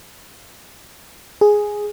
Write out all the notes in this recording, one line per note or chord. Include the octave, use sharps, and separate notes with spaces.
G#4